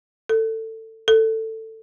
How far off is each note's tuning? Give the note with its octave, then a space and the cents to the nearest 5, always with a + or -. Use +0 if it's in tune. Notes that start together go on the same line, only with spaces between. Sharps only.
A4 +20
A4 +15